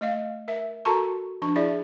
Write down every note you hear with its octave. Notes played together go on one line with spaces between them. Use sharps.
A3 D#5 F5
A#4 E5
F#4 A4 A#4 A5 A#5 C#6
F3 D4 C#6
E4 G#4 D5 E5